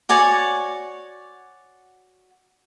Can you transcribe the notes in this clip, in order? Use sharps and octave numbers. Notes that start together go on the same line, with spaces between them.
F#4 C#5 D5 G#5